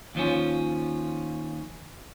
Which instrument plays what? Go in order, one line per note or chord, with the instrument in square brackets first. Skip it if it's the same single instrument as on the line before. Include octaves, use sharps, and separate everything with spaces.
[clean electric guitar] D#2 F3 C#4